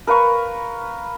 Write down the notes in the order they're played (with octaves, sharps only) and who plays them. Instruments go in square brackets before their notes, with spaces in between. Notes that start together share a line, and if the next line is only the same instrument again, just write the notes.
[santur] A#4 B4 F5 C#6